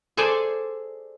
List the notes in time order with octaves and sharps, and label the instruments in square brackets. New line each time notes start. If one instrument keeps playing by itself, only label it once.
[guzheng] G#4 A4 C5 D5 G#5